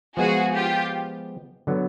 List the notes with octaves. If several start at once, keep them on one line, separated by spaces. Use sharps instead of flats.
F3 G#3 B3 F#4 G#4
F4 G4
D3 F#3 B3